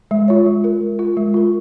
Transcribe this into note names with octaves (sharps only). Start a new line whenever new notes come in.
G#3
F4 C#5
G#3
F4 A#4
G#3
F4 A#4
G#3
F4 A#4